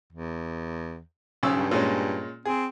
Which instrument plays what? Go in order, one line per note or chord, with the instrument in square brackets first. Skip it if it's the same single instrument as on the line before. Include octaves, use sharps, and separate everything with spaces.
[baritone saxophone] E2
[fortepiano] B1 C#3 E6
[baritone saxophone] G2
[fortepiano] A#2 G#3 C#4
[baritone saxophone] C4 [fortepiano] G#4